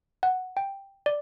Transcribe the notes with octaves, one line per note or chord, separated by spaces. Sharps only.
F#5
G5
D5